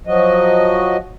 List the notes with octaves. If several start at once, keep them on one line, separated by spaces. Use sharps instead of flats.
F3 F#3 F#4 D#5